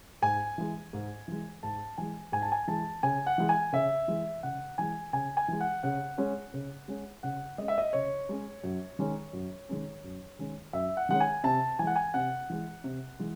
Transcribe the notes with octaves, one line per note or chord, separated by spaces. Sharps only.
G#2 G#5
E3 G#3
G#2
E3 G#3
G#2 A5
E3 G#3 G#5
G#2 G#5
A5
G#5
E3 G#3 A5
C#3 G#5
F#5
E3 G#3
G#5
C#3 E5
E3 G#3
C#3 F#5
E3 G#3 G#5
C#3 G#5
G#5
E3 G#3
F#5
C#3 F#5
G#3 C#4
C#3
G#3 C#4
C#3 F#5
G#3 C#4 D#5
E5
D#5
C#3 C#5
G#3 C#4
F#2
D#3 G#3 C#4
F#2
D#3 G#3 C#4
F#2
D#3 G#3 C#4
F#2 E5
F#5
D#3 G#3 C#4 F#5
G#5
C3 A5
E3 G#3 F#5 G#5
G#5
C3 F#5
E3 G#3
C3
E3 G#3